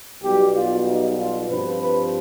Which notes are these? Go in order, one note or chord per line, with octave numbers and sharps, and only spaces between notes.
B1 B2 G3 G4
F4
D#4
F4
G2 F3 C4 B4
B4